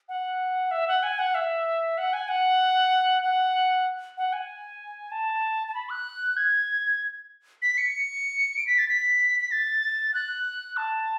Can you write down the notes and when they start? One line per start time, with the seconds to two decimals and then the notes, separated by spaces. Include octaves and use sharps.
0.09 F#5
0.71 E5
0.88 F#5
1.03 G#5
1.19 F#5
1.35 E5
1.98 F#5
2.13 G#5
2.29 F#5
3.23 F#5
4.17 F#5
4.33 G#5
5.11 A5
5.67 A5
5.74 B5
5.90 F#6
6.37 G#6
7.62 B6
7.78 C#7
8.57 D7
8.67 B6
8.78 A6
8.88 B6
9.40 B6
9.52 A6
10.14 F#6
10.77 A5